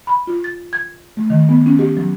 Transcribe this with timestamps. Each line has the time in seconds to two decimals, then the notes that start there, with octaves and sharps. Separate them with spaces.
0.07 B5
0.27 F4
0.44 A6
0.73 G#6
1.17 A3
1.30 D#3
1.49 B3
1.66 C#4
1.79 G4
1.97 F#3